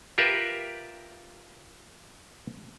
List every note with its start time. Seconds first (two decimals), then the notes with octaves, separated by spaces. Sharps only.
0.18 F4 G4 A#4 B4 E5